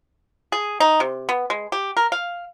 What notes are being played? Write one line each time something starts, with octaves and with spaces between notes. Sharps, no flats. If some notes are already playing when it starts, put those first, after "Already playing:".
G#4
D#4
C3
B3
G#3
G4
A#4
F5